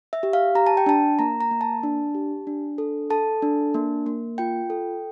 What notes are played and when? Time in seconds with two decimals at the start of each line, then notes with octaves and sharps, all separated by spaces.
0.13 E5
0.23 G4
0.33 F5
0.55 G4 A#5
0.67 A5
0.77 G5
0.86 D4 A5
1.19 A#3 A#5
1.41 A#5
1.51 A#3
1.61 A5
1.83 D4
2.14 G4
2.47 D4
2.78 A4
3.10 A4 A5
3.42 D4
3.74 A#3
4.06 A#3
4.38 F4 G5
4.70 A4